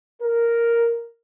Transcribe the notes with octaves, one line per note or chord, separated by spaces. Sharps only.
A#4